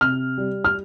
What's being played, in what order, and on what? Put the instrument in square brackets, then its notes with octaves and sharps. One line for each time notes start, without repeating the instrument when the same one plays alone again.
[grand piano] C3 F6
G3
F6